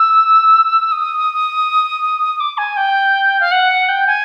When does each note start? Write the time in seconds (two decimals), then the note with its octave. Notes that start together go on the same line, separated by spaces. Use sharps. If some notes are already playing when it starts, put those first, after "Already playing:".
Already playing: E6
0.91 D#6
2.40 D6
2.57 G#5
2.76 G5
3.40 F5
3.51 F#5
3.88 G5
4.07 G#5